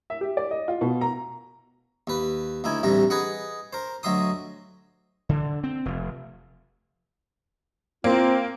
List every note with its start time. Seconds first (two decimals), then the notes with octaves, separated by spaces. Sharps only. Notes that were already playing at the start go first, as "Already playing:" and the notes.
0.10 E5
0.21 G4
0.37 D5
0.51 D#5
0.68 F4
0.81 B2
1.01 A#5
2.07 D#2 B4
2.64 D2 D#4 E4 G#5
2.83 A1 D2 C3 G3 A#5
3.10 G#4 B4 D#5 F#5
3.73 A#4 C5
4.03 D2 F#3 D#5 E5 C6 D#6
5.29 D3
5.64 C4
5.86 F1
8.04 A#3 C4 F4